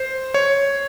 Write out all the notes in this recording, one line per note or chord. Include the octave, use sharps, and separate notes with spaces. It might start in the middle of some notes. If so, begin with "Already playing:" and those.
Already playing: C5
C#5